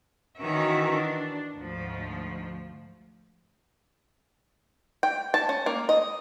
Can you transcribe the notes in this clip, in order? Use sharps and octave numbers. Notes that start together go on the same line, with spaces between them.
D#3 E3 C#4 F#4 A#4 E5
D4
D2 G#2 F3
G5
A5
C#4
A#3
D#5